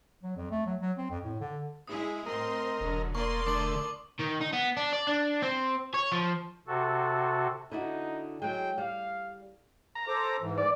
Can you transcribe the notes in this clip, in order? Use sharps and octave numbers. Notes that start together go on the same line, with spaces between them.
F#3
F2
A3
F#3
F#3
C4
F2
A2
D3
G#3 E4 G#4 D#6
A2 C4 A#4 D#5 C6
E1 D3 F#3
A#3 A#4 D5 C6 C#6
D3 A3 D6 F#7
D#3
D#4
B3
D4
D5
D4
C4
C#5
F3
C3 F#4 A4
D3 D#4 E4 F#4
F#3 G#3 G5
G3 F5
A#5
A4 C5 D6
G#2 E3
D5